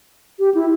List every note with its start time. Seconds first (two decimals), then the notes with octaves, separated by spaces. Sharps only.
0.39 G4
0.55 E4